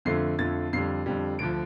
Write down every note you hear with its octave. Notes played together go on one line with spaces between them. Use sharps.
F2 D3 F3 A3 C7
F2 D3 F3 A3 A6
F2 D3 G3 C7
F2 D3 G3
D2 D3 F3 D7